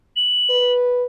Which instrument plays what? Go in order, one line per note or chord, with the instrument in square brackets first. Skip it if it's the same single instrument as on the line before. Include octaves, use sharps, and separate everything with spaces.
[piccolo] F#7
[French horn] B4